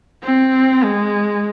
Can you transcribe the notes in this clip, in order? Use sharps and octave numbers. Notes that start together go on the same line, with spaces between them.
C4
G#3